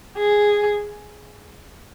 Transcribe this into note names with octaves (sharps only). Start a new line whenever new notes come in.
G#4